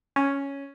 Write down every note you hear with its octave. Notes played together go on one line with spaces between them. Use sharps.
C#4